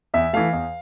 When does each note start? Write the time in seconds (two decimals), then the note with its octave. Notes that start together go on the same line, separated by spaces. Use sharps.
0.14 E2 E5
0.33 E3 A3 F5
0.53 E2